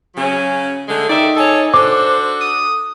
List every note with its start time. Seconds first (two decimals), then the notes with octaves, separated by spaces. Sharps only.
0.16 C#3 F#3 C#4
0.88 D3 G#3 A3
1.10 D#3 D#4 D5 E5
1.36 G#4 A4 C#5
1.74 D4 F#4 A4 C5 D6
2.41 D#6